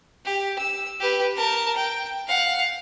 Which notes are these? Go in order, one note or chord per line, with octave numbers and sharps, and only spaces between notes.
G4
E6
G4 B4
A#4 A5
G5
F5 F#5